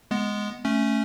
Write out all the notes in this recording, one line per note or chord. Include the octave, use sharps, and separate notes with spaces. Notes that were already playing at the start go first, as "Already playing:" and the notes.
G#3 B3
A3 C#4